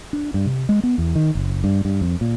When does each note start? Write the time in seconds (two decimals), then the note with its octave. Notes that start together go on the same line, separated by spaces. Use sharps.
0.13 D4
0.34 G2
0.46 C3
0.69 G#3
0.83 B3
0.98 E2
1.15 D#3
1.35 F#1
1.64 G2
1.85 G2
2.01 F2
2.21 A#2